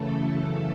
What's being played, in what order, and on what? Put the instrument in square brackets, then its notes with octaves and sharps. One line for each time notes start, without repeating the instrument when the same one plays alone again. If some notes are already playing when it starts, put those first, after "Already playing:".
Already playing: [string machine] F#2 C#3 E3 A3 A4